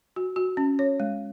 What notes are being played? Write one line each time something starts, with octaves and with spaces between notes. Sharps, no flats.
F#4
F#4
C#4
C#5
G#3